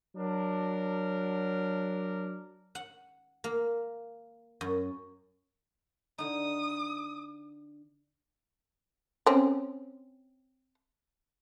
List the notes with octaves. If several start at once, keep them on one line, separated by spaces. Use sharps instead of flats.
F#3 D4 A#4
F#5
A#3
F#2
D3 D#4 D#6
C4 C#4